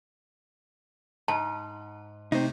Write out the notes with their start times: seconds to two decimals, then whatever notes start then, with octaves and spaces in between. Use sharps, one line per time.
1.28 G#2 A5
2.32 C3 A3 C4 D#4 C5